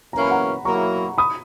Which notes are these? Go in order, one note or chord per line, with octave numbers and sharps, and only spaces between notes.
F#2 E3 A#3 C#4 A#5
B5
F#5 A#5
F#3 A#3 E4 A#5 C#6
B5 D#6